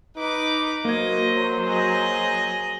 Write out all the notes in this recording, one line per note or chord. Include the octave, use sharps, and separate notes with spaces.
D#4 B4 D6
F#3 A#3 C5 D#5 G#6
G#4 D#5